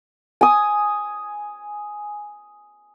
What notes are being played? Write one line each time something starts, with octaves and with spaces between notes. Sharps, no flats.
G#5 D#6